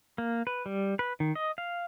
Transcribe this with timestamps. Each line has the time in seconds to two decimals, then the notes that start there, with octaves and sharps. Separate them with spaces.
0.18 A#3
0.47 B4
0.66 G3
0.99 B4
1.20 D#3
1.35 D#5
1.58 F5